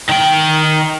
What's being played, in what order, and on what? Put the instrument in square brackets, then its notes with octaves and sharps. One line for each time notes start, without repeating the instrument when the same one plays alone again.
[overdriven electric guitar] D#3 G5